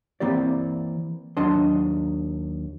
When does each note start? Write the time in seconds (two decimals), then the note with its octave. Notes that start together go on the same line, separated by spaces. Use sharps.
0.20 E3 A#3 C4 G4 D5
1.37 D#2 F#3 D4 D#5 A5 C6